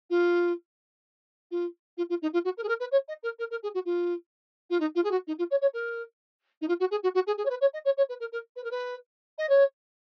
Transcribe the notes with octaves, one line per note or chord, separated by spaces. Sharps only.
F4
F4
F4
F4
D#4
F4
F#4
A#4
G#4
A#4
B4
C#5
D#5
A#4
A#4
A#4
G#4
F#4
F4
F4
D#4
F4
G#4
F#4
D#4
F4
C#5
C#5
A#4
D#4
F4
F#4
G#4
F#4
F#4
G#4
G#4
C#5
B4
C#5
D#5
C#5
C#5
B4
A#4
A#4
B4
A#4
B4
D#5
C#5